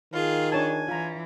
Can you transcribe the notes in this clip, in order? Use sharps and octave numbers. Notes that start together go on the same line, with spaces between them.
D#3 F4 G#4 F5
D4 C#5 G#5 A5
E3 F4 A#5